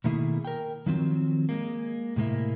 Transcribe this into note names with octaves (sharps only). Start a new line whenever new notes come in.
B2 D#3 A3 A#3 E4 G#4
A#4 G5
D#3 F3 F#3 C4
G#3 A#3
A2 C3 G#3 A#3 E4